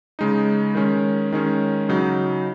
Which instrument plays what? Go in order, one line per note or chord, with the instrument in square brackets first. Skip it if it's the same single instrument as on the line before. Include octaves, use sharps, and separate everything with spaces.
[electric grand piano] C#3 G#3 D#4
D#3 G#3 C#4
D#3 G#3 C#4
C#3 F#3 D#4